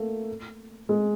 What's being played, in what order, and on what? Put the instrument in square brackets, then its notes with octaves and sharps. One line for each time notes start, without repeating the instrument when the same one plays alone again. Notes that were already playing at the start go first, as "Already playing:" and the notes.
Already playing: [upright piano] A3 A#3
G#3